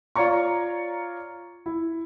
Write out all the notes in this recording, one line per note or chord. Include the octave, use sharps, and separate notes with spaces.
F4 C#5 D5 A#5 C#6
E4